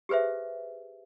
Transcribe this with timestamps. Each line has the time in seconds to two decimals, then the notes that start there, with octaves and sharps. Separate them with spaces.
0.09 G4 G#4 B4 C5 E5